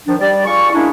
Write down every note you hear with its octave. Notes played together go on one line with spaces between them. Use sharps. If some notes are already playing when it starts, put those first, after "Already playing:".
D#3 F3 D4
G3 D5
F4 G#4 D5 C#6
G#3 A#3 C#4 D4 E4